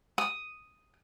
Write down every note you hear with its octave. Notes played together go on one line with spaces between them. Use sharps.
D#6